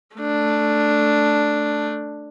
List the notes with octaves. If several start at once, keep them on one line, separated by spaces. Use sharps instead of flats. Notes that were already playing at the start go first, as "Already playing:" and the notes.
A3 D4